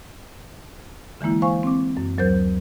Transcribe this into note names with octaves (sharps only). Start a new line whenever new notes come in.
D3 E3 G#3 A#3 E4
C5 F5 G#5 C#6
C4 D6
F#2
D2 F#3 A#4 C5 G6